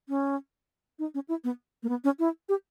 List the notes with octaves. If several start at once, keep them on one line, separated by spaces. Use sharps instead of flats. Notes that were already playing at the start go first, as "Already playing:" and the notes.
C#4
D#4
C#4
E4
B3
A#3
B3
C#4
E4
G4